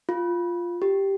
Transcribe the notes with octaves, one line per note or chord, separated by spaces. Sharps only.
F4
G4